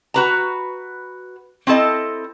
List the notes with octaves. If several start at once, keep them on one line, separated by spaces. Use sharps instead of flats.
F#4 B4 A#5
C4 E4 A4 D#5